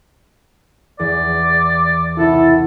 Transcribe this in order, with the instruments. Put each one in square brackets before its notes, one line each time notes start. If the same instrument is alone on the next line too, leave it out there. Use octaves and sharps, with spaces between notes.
[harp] E2 [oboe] D5
[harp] C2 F#4 [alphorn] E4 [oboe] A4